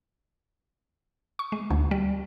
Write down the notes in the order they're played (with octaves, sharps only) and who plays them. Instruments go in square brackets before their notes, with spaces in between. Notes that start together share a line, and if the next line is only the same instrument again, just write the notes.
[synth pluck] C#6
G#3
D2
G3